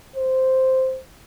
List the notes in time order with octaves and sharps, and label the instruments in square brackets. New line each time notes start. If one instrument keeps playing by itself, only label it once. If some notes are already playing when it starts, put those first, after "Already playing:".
[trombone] C5